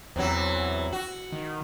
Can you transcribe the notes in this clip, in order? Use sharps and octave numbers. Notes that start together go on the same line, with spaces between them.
E2 C3 E3 F#3
F#4
D#3